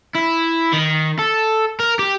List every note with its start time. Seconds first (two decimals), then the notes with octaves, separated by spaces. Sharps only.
0.15 E4
0.73 D#3
1.19 A4
1.80 A#4
1.99 G4